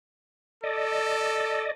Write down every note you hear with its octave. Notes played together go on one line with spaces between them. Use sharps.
A4 D5 D#5